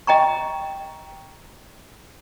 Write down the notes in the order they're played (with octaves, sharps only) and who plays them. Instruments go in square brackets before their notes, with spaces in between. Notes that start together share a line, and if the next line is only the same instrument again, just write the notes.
[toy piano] D#5 G5 A#5 C#6